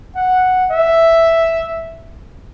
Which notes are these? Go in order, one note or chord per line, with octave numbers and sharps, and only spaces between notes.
F#5
E5